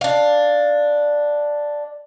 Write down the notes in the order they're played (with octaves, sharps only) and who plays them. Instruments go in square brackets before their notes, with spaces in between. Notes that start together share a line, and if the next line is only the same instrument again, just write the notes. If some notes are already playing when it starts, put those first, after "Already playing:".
[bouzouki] D4 F5